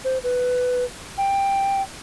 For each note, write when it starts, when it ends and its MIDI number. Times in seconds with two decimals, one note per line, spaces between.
0.05 0.18 72
0.24 0.84 71
1.18 1.82 79